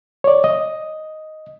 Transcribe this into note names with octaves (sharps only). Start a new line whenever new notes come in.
C#5 D5
D#5